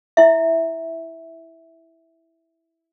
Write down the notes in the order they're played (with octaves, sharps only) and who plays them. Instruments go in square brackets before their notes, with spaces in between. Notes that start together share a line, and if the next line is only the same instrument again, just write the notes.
[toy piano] E4 E5